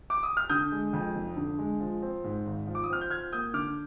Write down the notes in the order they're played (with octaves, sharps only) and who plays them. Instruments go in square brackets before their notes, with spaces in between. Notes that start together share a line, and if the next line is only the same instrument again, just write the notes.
[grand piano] D6
D#6
F6
D3 D#6 G6
G#3
F2
F1
D3
G#3
F3
C4
G#2
G#1
F3
D6
D#6
C4 F6
G6
F3 F6 G#6
A#3 D#6 G6
D3 D6 F6